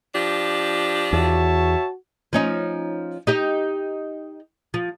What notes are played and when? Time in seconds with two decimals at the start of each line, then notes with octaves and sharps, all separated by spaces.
0.15 F3 D4 G4
1.13 E2 F#4 C#5 E5 A5
2.33 F3 C#4 D#4
3.27 D#4 G4 D#5
4.74 F3